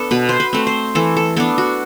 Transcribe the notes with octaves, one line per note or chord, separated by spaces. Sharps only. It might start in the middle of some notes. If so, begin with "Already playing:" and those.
Already playing: B3 D4 A4
B2 B4
C5
B4
A3 C4
C5
E3 A4
A4
B3 D4 A4
F#4